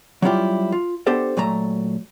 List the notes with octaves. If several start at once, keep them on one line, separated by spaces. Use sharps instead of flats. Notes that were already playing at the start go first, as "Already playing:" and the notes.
F#3 G3 C#4 E4 F4 G4
F4
B3 D4 G4 A4 C5
A#2 F#3 A3 A#5